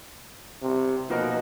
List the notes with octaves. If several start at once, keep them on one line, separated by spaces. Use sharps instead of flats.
C3
B2 F3 A#3 D#4 F#4 A#4